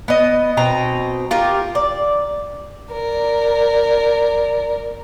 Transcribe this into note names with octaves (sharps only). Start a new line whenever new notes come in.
B3 D#5
B2 C4 D#4 A#5
F4 G4 A#4
D5
A#4 D5